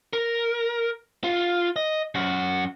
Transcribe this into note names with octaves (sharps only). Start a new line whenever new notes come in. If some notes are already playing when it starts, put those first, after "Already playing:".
A#4
F4
D#5
F#2 F#4